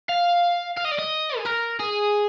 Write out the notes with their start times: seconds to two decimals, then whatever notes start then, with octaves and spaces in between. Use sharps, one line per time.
0.09 F5
0.77 F5
0.85 D#5
0.92 D5
0.99 D#5
1.38 G#4
1.45 A#4
1.80 G#4